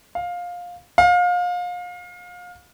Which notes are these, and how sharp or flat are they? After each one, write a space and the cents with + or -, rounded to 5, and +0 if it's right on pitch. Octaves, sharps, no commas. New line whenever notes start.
F5 +15
F5 +30